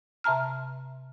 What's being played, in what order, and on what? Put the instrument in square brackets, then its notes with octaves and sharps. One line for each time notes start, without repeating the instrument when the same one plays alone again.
[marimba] C3 E5 A5 A#5 F6